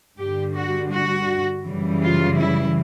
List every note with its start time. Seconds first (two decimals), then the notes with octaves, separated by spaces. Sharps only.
0.19 G2 D3 G3 G4
0.56 F#4
0.93 F#4
1.66 F#2 C#3 E3 G3
2.03 F4
2.39 E4